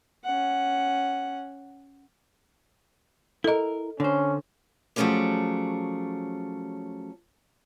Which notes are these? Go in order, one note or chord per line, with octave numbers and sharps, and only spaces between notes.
C#4 F#5
E4 A4 A#4 D#5
D3 C#4 C5
F3 F#3 A3 C#4 G#4 D5